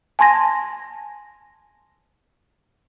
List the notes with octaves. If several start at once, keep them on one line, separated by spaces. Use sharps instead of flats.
G#5 A5 C6 G#6 A#6